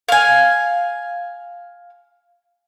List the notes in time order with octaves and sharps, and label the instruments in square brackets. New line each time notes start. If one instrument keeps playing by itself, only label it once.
[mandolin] F5 G#5